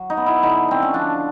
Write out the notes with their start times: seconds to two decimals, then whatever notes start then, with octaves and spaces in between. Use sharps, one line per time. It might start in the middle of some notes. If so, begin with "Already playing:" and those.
Already playing: F#3
0.10 D#4
0.17 B3
0.26 E4
0.43 D3 D#4
0.68 D3 C4
0.82 C#4
0.94 F3 D4